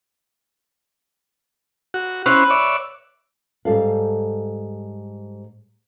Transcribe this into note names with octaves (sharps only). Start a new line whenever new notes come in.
F#4
C#4 E4 B4 C5
C#5 D5 E5
G#2 G3 A4 F5